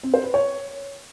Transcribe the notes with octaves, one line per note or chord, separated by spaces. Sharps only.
C4
C5
B4
C#5